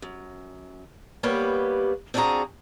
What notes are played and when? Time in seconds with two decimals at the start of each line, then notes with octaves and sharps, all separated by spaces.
0.02 F#2
1.23 G3 A#3 B3 G4 B4 C#5
2.14 C4 D4 F4 F#4 G#4 A#5